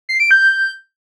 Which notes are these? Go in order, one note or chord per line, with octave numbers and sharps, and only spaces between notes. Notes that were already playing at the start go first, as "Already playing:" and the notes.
C7
D7
G6